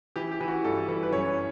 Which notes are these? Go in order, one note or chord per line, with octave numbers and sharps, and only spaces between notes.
E3 G4
G4
E3
F#4
G2 A4
E3
B4
F#2 C#5